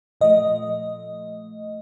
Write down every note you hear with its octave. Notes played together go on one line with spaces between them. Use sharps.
A#2 F3 A3 D#5